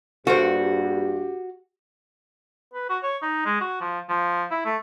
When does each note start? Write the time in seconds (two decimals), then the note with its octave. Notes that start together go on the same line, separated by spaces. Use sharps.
0.27 A#1 G2 F#4 G4 A4 A#4 C5
2.74 B4
2.90 F#4
3.03 C#5
3.22 D#4
3.46 G#3
3.61 F#4
3.81 F3
4.09 F3
4.51 E4
4.65 A3